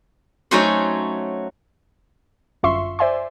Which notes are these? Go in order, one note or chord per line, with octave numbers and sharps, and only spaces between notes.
F#3 A3 C#4 D#4 F#4 C5
G1 F#2 F4 E5 C6 C#6
C5 D5 E5 G#5 C6